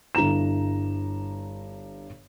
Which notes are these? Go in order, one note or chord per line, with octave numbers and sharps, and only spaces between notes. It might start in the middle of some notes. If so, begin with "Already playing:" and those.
G1 G2 E4 A#5 E7